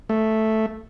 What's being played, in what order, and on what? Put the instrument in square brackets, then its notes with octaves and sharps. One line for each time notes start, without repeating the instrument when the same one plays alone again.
[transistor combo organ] A3